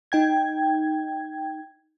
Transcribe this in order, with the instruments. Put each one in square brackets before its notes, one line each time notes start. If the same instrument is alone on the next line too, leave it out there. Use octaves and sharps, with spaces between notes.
[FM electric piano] D#4 G5 G#6